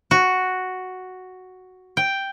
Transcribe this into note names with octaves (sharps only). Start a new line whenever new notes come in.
F#4
G5